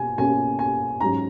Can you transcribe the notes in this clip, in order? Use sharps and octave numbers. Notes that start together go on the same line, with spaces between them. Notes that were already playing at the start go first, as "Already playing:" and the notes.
Already playing: B2 A#3 G#5
B2 A#3 C#4 G#5
G#5
G#2 F#3 C#4 A#5